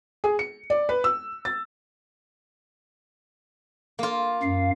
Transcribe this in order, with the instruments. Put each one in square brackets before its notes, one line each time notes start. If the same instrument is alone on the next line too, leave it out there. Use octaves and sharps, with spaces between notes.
[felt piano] G#4
C#7
D5
B4
E6
A6
[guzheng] A#3 F4
[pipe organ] F#2 F5